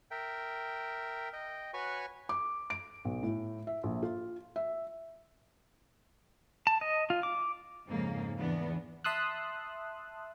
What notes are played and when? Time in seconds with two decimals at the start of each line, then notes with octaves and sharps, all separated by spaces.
0.11 A#4 E5 G5
1.33 D#5 G5
1.74 F#4 B4 C#5 G#5 C#6
2.29 D6
2.70 D7
3.05 B1
3.23 A2
3.67 E5
3.83 A#1
4.03 F4
4.56 E5
6.67 A5
6.81 D#5
7.10 F4
7.23 D6
7.87 F2 G#2 C#3 A#3
8.38 E2 B3 D4
9.04 E5 A5 C6 D#6 E6 F#6